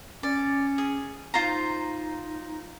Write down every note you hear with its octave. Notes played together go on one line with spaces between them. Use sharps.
C#4 D5
G#4
D#4 F4 C5 A#5